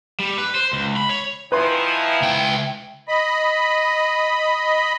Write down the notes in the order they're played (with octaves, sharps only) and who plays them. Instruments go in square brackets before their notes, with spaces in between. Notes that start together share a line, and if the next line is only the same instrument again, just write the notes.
[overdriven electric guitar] G3
B4
C5
C#2
B5
C#5
[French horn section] D#3 F3 [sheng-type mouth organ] E4 G#5 D#6 [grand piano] B4 C6
[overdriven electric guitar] C#2 G5
[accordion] D#5 B5